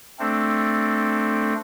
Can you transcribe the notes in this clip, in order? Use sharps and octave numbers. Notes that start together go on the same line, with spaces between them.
A3 C4 D4 A4